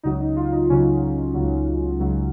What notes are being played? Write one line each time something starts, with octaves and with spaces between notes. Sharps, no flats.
C#2 C#3 F#3 D#4
D#4
F4
D#4
C#2 C#3 F#3 C#4
C#2 C#3 F#3
C#2 C#3 F#3